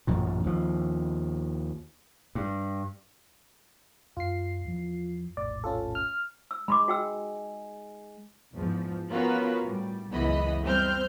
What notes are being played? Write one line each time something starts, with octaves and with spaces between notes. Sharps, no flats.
A1 F#2 A#2
D#2 F3
G2
F#2 F4 C7
E2 F3
F1 A#1 A2 D5
C#4 F4 A4
F6
E6
G#3 B5 C6 D6
F#4 G5 E6
E2 G#2 F3
B3 C#4 F4 F#4 A#4 B4
A2 G3
C#2 F#2 E3 B3 D#5 B5
G3 C4 C5 F6 G6